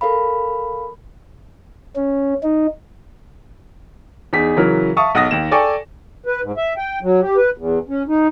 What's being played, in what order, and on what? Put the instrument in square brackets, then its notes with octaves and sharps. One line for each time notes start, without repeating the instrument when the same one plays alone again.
[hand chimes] A4 A#4 F5 B5
[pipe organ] C#4
D#4
[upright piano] E2 D#4 G#4 B6
C#3 E3 F#3 A#4
E5 F5 A5 C#6 D#6
B1 F#5 D#6 A#6
D#2 E7
A4 D5 G5 G#5 C#6 D6
[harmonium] B4
G#2
E5
G5
F#3
G4
B4
E2
C#4
D#4